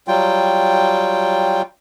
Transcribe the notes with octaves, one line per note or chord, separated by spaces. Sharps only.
F#3 G3 F4 G5